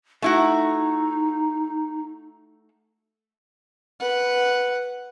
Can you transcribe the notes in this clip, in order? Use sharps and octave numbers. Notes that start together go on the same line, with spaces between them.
A3 D#4 E4 F#4
B4 F#5